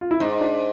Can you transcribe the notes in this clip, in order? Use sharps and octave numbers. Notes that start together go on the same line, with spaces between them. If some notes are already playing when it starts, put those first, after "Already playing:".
F4
E4
G#2 D#4
D4